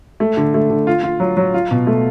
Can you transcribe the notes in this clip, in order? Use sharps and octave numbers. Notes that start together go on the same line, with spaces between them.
A3
D3
A3
D3
F4
F4
F#3
F#3
F4
B2
A3